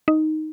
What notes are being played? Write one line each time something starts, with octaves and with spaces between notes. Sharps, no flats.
D#4